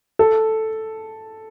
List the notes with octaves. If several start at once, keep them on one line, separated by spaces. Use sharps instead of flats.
A4